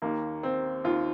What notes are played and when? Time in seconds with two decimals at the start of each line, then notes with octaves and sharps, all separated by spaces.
0.02 D#2 D#3 A#3
0.43 C4
0.85 D#2 D#3 F4